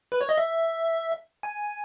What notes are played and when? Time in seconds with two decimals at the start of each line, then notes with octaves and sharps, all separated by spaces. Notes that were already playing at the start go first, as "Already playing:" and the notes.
0.12 B4
0.21 C#5
0.29 D#5
0.38 E5
1.43 G#5